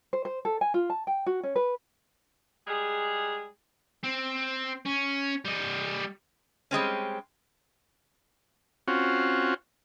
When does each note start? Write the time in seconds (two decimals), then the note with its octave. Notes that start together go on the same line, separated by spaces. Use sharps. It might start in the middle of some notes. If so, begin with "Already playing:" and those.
0.13 C5
0.25 C5
0.45 A4
0.61 G#5
0.74 F4
0.90 A5
1.07 G5
1.26 F#4
1.43 C#4
1.56 B4
2.68 G3 G#3 G#4
4.04 C4
4.85 C#4
5.45 G3 D#5
6.71 G3 G#3 C4 C#4
8.88 C4 C#4 F4 F#4